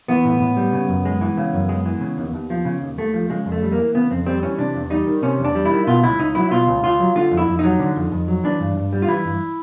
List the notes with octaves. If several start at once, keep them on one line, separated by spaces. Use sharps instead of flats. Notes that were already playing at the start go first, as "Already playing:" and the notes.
E3 B3
A2
A2
G3
C#3
F#2
G#3
E3
C#3
F#2
G#3
E3
C#3
D#2
D#2
F3
C#3
D#2
D#2 A3
F3
C#3 G#3
F2
A3
G3
A#3
E3
C#3 B3
F2 C4
G3 C4
E3 C#4
C3 D4
E2
G3 D#4
D#3
C3 C#4
E2
D4
G3
E4
D#3
B2 F4
C#2 E4
C#2 D#4
F#3 E4
B2 F4
C#2
C#2 F4
F#3
D3 F4
F2
E4
F2
F#3 D#4
D3
F2
F2
F#3
E3 D4
G2
G2
G3
F4
E3 E4
G2